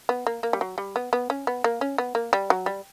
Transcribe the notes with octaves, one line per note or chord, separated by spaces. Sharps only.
B3
A#3
A#3
G3
F#3
G3
B3
B3
C#4
B3
A#3
C#4
B3
A#3
G3
F#3
G3